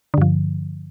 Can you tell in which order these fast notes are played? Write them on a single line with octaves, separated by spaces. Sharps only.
D3 G2 F3